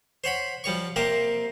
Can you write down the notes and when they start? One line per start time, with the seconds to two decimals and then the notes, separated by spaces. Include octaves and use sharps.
0.24 C5 C#5 F#5 B5
0.64 F3 G3 C#5 C#6
0.96 C3 A#3 G4 A#4 C5